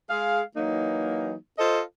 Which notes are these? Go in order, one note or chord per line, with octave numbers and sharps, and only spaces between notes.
G#3 G#4 F5
E3 F#3 A#3 D#4
F4 A4 C5 D#5